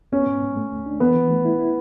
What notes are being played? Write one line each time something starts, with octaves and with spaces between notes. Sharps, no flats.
B3 C#4
G#2
G#2
A3
D2
D4
E3 B3
E3
A3
E4
E4